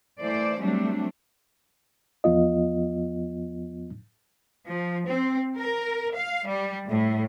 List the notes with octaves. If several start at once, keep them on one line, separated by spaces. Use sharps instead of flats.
E3 A3 C5 D5
F#3 G3 A3 C4 D4
E2 F3 B3 F4 D#5
F3
C4
A#4
F5
G3
A2